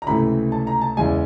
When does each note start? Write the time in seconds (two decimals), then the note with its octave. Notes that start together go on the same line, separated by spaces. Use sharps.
0.02 A#5
0.07 C#2 C3 E3 A3 B5
0.52 A5
0.67 A#5
0.81 A5
0.97 E2 C#3 E3 G#3 G#5